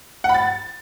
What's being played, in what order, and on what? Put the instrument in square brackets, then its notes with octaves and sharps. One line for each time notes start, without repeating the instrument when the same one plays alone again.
[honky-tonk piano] F#5
B5
A6